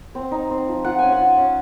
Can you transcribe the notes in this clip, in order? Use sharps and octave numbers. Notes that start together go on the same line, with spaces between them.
C4
D#4
C4
F3
F4 F#5
C#4 G#5
F#5
F4
C#4